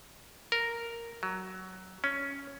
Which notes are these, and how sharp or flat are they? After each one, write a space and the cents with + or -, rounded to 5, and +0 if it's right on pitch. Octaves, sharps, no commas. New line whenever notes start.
A#4 -5
F#3 +15
C#4 +5